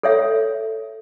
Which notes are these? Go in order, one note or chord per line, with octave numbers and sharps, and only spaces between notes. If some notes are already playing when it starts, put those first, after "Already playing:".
A4 C#5 E5